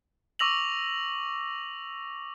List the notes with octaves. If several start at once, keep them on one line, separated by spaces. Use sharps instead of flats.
C#6 D6 E6 A#6 F7 F#7